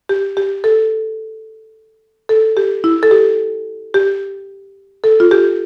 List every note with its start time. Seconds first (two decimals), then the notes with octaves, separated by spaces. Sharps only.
0.09 G4
0.37 G4
0.64 A4
2.29 A4
2.57 G4
2.84 E4
3.03 A4
3.11 G4
3.94 G4
5.04 A4
5.20 F4
5.31 G4